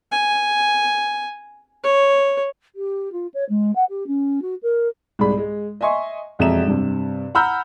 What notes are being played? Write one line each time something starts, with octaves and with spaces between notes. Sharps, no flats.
G#5
C#5
G4
F4
C#5
G#3
F#5
G4
C#4
F#4
A#4
C2 G#2 G#4 B5
G#3
D#5 E5 G#5 C6 C#6
E1 F2 E5 A#5 E7
G2 C3
F#5 A#5 B5 E6 F6 G6